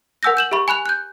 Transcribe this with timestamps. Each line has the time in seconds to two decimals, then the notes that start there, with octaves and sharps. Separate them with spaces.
0.23 A#4 F#5 G#5 E6 G6 A#6
0.37 G6 E7 F#7
0.51 G4 E5 B5 C#6
0.68 G#5 B5 F#6 F7
0.86 F#6 G6